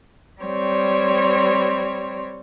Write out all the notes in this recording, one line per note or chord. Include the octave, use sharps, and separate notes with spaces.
G3 C4 C#5